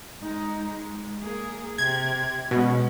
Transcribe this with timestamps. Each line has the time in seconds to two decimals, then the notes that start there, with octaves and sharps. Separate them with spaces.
0.20 G#3 D#4
0.67 G#3
1.22 A#3 G#4
1.78 C3 G#6
2.51 B2 G#3 C#4